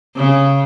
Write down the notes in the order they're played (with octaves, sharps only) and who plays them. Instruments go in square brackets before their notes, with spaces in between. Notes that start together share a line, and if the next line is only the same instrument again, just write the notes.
[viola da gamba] C#3